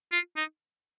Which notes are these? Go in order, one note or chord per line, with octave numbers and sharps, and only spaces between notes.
F4
D#4